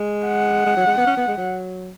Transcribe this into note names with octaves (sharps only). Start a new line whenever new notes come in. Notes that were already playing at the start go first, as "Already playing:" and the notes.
Already playing: G#3
F#5
G#3
F#3
G#3
B3
C#4
B3
G#3
F#3